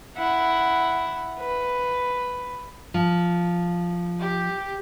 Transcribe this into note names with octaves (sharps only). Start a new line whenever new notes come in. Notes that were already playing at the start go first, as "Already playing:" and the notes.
E4 F#5
B4
F3
G4